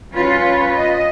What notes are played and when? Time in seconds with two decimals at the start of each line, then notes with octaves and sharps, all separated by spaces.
0.15 C#4 F4 B4 C#5
0.75 D#5